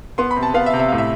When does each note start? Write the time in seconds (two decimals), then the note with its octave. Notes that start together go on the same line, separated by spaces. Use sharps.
0.18 B3 C6
0.31 B5
0.36 C3
0.43 A5
0.54 B3 F5
0.66 E5
0.73 C3
0.79 E5
0.88 A2 F5
0.98 E5